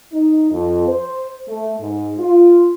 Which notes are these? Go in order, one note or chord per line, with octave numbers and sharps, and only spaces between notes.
D#4
F2
C5
A3
G#2
F4